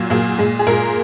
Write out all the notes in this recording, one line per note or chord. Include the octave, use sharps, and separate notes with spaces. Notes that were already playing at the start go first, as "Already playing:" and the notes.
Already playing: A#2 F#3 A#3
A#2 F#3 A#3 G#4
A#2 G#3
G#4
A#2 G#3 A#4